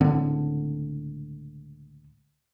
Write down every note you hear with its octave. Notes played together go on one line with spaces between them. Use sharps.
C#2 A2 D3 C4